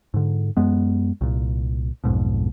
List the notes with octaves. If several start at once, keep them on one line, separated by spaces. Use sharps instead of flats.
G#2 D3
F#2 G#3 B3
C2 A#2
B1 F2 G#2 B2